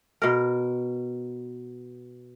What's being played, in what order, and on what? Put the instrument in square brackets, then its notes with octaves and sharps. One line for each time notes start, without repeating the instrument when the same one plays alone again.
[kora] B2 A#4